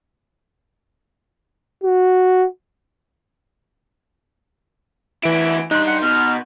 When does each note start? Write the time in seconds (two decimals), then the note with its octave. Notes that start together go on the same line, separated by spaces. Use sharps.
1.84 F#4
5.23 D2 E3 E4 D7
5.71 G2 D#4 C6 F#6
5.86 F#5
6.02 B2 F6